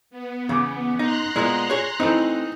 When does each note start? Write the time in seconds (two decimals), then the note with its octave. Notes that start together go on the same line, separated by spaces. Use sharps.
0.10 B3
0.49 E2 C#3 D6
0.99 D#4 A#5 C6 F#6
1.36 A#2 G#3 B3
1.70 G#4 C#5
2.00 E3 A3 C4 D#4